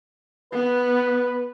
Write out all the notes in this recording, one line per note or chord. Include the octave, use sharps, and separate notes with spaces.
B3 B4